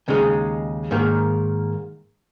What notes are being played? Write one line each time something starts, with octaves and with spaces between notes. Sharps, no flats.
D#2 C#3 G#3 D#4
G#2 D#3 A#3